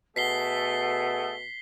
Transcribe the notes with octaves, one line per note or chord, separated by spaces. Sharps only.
B2 A3 G#4 A4 F#5 B6 C7 G7